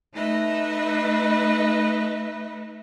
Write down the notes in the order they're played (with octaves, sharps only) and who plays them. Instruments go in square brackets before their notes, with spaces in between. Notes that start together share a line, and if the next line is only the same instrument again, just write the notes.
[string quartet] A3 D#4 B4 D#5 E5